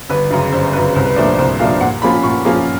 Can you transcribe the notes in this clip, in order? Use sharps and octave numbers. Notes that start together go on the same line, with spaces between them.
G1 B4
F#2 C#3
G1 C5
F#2 C#3 B4
C2 C5
B4
A#2 F3 A3 D4 C5
C5
C2 C5
A#2 F3 A3 D4 F5
A#2 F#5
F3 A#3 C#4 F4 B5
A#2 C#6
F3 A#3 C#4 F4